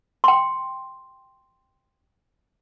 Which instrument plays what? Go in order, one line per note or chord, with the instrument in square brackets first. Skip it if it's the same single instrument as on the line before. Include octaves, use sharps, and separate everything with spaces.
[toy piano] G5 C6